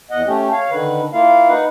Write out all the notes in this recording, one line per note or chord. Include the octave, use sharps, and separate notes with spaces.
E2 D#5 F#5
A3 C#4 G4
C#5 F5
D3 D#3 B4
A#3 E4 F4 F5
D#4 B4 F#5